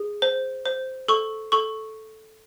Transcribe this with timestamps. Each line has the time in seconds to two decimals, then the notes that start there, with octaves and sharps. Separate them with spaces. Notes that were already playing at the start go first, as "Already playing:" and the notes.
Already playing: G#4
0.22 C5
0.66 C5
1.08 A4 C#6
1.52 A4 C#6